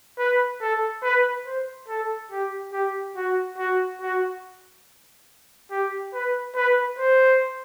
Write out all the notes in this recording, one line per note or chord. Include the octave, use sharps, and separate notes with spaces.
B4
A4
B4
C5
A4
G4
G4
F#4
F#4
F#4
G4
B4
B4
C5